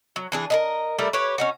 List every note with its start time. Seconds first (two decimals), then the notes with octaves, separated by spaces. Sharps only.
0.16 F#3
0.32 E3 D4 G#4
0.50 A#4 B4 D#5
0.99 G3 A3 E4 A#4
1.13 G4 B4 C#5
1.38 C#4 D#4 F#4